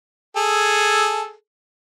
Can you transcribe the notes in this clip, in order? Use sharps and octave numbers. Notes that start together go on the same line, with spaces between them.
G#4 A4